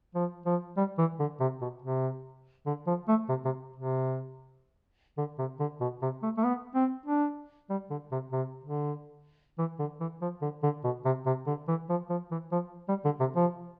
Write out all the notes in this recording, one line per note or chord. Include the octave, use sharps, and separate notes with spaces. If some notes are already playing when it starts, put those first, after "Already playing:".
F3
F3
G3
E3
D3
C3
B2
C3
D3
F3
A3
C3
C3
C3
D3
C3
D3
B2
C3
A3
A3
B3
C4
D4
G3
D3
C3
C3
D3
E3
D3
E3
F3
D3
D3
B2
C3
C3
D3
E3
F3
F3
E3
F3
G3
D3
C3
F3